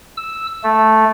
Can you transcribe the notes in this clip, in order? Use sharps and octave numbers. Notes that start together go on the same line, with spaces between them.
E6
A3